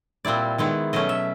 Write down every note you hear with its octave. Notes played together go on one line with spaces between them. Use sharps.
A#2 G3 C4 E4 D5
D#3 G#3 B3 E4
B2 F#3 A3 C#4 D#5
E5